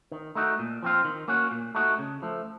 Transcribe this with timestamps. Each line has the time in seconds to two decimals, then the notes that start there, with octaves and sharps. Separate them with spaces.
0.12 D#3
0.35 A3 D#4 F#4
0.59 A#2
0.83 F3 C4 F4
1.05 D#3
1.28 A#3 C#4 F#4
1.51 A#2
1.75 A3 D#4 F#4
1.99 C#3
2.22 F3 A3